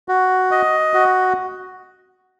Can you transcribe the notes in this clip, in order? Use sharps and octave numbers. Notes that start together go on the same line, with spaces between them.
F#4
D#5
F#4